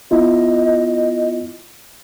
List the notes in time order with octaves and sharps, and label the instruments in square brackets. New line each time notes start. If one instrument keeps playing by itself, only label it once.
[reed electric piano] B3 E4 F4 [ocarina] D#5